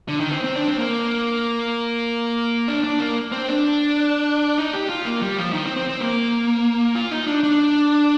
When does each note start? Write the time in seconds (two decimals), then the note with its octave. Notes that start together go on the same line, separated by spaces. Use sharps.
0.08 D3
0.20 D#3
0.31 C4
0.44 C4
0.55 D4
0.68 C4
0.79 A#3
2.68 D4
2.84 D4
3.00 A#3
3.32 C4
3.48 D4
4.58 D#4
4.73 G4
4.89 F4
5.05 A#3
5.22 G3
5.38 F3
5.53 D#3
5.65 C4
5.76 C4
5.89 C4
6.00 A#3
6.95 F4
7.11 D#4
7.27 D4
7.43 D4